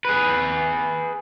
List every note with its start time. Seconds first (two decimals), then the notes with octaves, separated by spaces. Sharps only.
0.05 G#4 B4